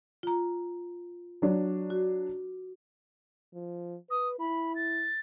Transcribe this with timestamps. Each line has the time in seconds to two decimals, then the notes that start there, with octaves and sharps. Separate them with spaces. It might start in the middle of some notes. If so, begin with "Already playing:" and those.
0.23 F4 A#5
1.42 F#3 D4
1.90 F#4
3.54 F3
4.10 B4 D#6
4.39 E4 B5
4.75 A6